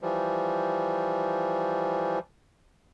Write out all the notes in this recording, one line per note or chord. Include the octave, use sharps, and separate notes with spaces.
E3 F3 G3